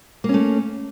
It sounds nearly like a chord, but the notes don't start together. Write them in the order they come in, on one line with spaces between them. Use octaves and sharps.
A#3 C#4 A3